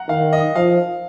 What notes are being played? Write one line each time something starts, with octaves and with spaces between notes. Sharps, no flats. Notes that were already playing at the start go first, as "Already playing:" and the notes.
Already playing: F#5 A#5
D#3 F5
D#5
F3 F5